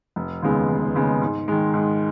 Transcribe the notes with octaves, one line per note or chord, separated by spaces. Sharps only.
F1
D#2 C#3 G#3 B3
F1
D#2 C#3 G#3 B3
G#2
D#3 G#3
G#2